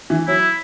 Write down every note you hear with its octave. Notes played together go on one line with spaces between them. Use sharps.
E3
F#3 E4